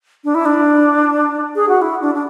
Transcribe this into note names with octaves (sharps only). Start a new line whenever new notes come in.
D4
E4
D4
G#4
F#4
E4
D4
D4